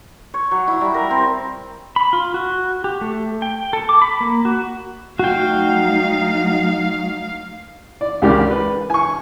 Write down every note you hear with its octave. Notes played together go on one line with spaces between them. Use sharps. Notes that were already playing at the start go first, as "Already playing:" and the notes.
C#5
F#3
E4
G3
A#4
C4
B5
F4
F#4
G4
A3
G5
A4
D6
B5
A#3
F#4
F#3 A3 D#4 F#4 F5 G5
D5
C#2 C#3 G4 A#4 D5
B4
G#5 C#6